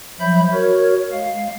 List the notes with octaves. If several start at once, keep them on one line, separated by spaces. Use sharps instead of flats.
F3 F#3 E5 B5 G6
F#4 A#4 C#5
G#3 F5